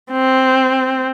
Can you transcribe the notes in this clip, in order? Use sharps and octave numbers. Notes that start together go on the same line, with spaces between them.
C4